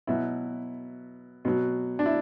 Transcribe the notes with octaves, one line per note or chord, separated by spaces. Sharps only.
B2 F#3 E4
B2 F#3
D4
E4